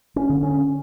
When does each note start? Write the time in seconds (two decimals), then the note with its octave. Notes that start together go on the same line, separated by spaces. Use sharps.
0.16 C#4
0.29 D3
0.43 C#4